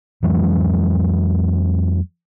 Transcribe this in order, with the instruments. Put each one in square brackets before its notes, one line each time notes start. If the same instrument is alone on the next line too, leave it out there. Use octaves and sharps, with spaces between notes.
[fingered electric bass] F2 E3 F#3 G#3